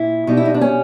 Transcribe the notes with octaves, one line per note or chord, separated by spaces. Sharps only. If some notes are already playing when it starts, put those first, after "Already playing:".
Already playing: A#2 E4
B2 G3 D#4
E4
D#4
D4
C#4